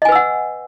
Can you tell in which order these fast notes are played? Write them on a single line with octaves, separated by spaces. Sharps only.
D#5 G#5 B4 E6 F#5